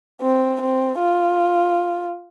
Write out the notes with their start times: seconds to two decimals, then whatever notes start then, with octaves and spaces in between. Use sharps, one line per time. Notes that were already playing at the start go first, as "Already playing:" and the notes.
0.21 C4
0.61 C4
0.99 F4